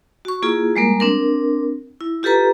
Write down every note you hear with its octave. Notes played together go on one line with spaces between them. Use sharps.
F#4 C#6
A#3 E4 F4 G#4
G3 G#3 A#3 A#4
C4 D4 A#4
E4
F4 G4 A4 B4 A#5